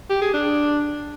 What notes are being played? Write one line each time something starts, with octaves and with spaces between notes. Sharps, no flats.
G4
G#4
D4